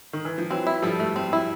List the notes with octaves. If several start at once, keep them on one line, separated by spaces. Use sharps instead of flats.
D#3
E3
F3
E3 F#3 C4
E4
F3 G3 A4
A3
C4
E4